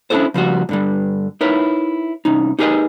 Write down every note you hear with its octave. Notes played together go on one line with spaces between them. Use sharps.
C#4 D4 E4 G4 A4 C5
C#3 F3 G3 F#4
G2 D3 G3
D#4 E4 A#4 B4 C#5
C2 C#4 D#4
D#4 G4 G#4 A#4 B4 D#5